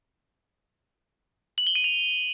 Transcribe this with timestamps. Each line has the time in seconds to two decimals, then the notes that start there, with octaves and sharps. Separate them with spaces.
1.58 F#7
1.67 G7
1.75 D#7
1.84 F7